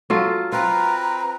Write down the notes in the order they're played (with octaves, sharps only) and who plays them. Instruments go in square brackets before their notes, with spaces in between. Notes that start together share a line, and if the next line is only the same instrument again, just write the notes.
[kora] F#3 F4 A4
[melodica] C4 B4 [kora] F4 [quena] A#5